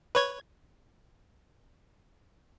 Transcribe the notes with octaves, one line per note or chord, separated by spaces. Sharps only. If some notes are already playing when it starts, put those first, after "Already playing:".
B4 C#5 G#6